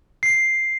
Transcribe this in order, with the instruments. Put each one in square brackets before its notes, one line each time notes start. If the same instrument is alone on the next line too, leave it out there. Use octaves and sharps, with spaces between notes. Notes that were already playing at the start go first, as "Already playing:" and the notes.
[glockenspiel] C7